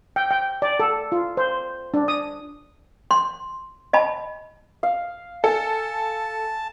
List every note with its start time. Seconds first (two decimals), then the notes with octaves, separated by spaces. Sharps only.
0.16 G5
0.31 G5
0.62 D5
0.80 A4
1.12 F4
1.37 C5
1.94 D4
2.08 D#6
3.11 C6
3.93 D#5 A5 B5
4.83 F5
5.44 A4 G#5 A5